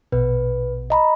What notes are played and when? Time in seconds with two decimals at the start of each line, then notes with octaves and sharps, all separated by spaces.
0.12 A#1 B2 B4
0.90 D#5 A#5 B5